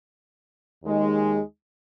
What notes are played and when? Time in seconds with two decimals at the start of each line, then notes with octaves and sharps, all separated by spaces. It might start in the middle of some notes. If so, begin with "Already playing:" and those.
0.83 D#2 D#3 G#3 D#4